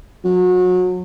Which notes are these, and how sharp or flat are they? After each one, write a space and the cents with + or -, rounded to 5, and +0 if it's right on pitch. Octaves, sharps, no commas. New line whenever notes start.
F#3 -30